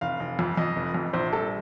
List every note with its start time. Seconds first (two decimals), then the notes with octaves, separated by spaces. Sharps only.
0.01 F1 F5
0.20 F1
0.39 F2
0.57 F2 D#5
0.76 F1
0.94 F2
1.13 A#1 C5
1.32 G3 A4